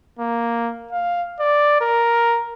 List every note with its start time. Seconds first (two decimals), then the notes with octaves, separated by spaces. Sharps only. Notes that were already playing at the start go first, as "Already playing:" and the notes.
0.19 A#3
0.92 F5
1.40 D5
1.81 A#4